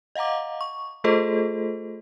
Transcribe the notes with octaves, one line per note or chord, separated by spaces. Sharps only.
D#5 F5 F#5 A#5 D6
C#6
A3 F4 G#4 A4 C5 D#5